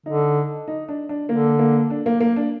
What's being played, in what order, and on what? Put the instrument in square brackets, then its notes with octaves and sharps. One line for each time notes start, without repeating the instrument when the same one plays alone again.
[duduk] D3 [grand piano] D#4
[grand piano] D#4
D4
D4
[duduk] D3 [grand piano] A#3
[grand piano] A#3
D4
A#3
A#3
D4